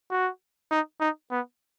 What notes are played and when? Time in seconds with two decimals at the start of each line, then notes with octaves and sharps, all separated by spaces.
0.11 F#4
0.71 D#4
1.00 D#4
1.31 B3